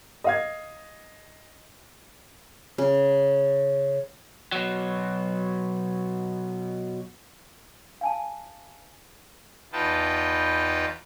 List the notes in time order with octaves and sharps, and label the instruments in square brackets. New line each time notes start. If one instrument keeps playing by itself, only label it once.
[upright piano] D#5 F5 G#6
[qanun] C#3
[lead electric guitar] B2 F#3
[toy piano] F5 G#5 A5
[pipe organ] E2 D#4 F4 B4 G5 A5